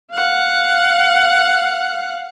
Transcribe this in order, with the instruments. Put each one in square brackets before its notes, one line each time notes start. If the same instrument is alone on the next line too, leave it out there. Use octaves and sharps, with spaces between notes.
[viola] F5 F#5